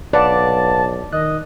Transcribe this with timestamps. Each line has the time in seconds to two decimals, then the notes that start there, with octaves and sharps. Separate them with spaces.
0.13 B1 B4 D5 F5 F#5 A5
1.13 D#3 D#5 F#6